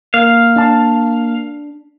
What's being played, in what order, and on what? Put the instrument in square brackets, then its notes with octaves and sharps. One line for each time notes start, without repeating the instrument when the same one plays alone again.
[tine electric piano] A#3 [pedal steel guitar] F5
[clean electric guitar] D4 A5